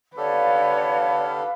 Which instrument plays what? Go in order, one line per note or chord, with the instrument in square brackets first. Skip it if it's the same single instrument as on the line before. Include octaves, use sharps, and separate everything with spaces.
[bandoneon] D3 G4 A4 [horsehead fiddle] B4 [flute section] C#5 D5 [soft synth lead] F5